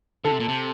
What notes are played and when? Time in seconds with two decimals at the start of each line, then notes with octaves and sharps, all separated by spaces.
0.24 D3 A4
0.32 C3
0.40 A#2
0.48 C3